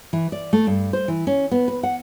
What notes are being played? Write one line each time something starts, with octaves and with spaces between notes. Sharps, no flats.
E3
D5
A3
G2
C5
E3
C#4
B3
B4
F#5